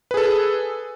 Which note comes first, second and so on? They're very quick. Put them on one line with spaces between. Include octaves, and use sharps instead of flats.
B4 G#4 A4